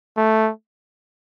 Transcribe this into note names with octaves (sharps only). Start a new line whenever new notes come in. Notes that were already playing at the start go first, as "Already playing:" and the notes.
A3